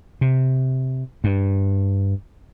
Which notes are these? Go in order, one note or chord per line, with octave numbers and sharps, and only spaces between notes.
C3
G2